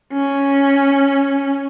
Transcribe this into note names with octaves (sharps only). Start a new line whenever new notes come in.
C#4